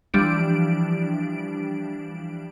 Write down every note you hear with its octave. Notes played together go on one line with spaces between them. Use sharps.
E3 F3 G3 D4 D7